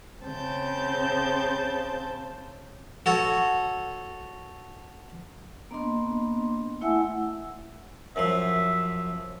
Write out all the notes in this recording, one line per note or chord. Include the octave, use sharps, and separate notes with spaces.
C#3 C4 A5 G6
F#4 A4 C#5
A#3 B3 D4 D#5 C6
A3 E4 E5 F#5 G#5 E6
F#2 F3 E5 C6